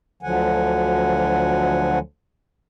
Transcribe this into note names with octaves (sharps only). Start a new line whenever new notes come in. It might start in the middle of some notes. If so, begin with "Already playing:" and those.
D2 D3 F3 F#3 F#5 G#5